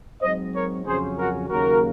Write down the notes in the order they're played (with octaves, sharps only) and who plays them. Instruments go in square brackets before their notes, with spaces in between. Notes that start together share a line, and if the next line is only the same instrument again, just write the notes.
[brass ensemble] G#2 F#3 C4 C5 D#5
A#4 C#5
F2 C#3 F#3 C#4 G#4 C5
F#4 A#4
D#2 C#3 F#3 A#3 F#4 A#4